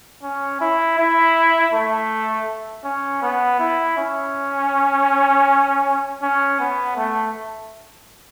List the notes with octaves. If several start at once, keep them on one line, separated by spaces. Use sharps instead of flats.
C#4
E4
E4
A3
C#4
B3
E4
C#4
C#4
B3
A3